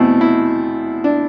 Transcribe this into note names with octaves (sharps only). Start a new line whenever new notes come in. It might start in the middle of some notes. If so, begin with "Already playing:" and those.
Already playing: E2 B2 A3 C4 E4
E4
D4